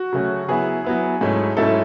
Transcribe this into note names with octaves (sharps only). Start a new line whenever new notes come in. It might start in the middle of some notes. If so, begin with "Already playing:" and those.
Already playing: F#4
C#3 F#3 A3 C#4
F#3 B3 E4 G#4
F#3 B3 E4
G#2 F#3 A3 C#4 E4
G#2 F#3 A3 C#4 E4 A4